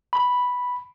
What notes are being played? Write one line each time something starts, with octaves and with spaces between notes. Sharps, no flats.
B5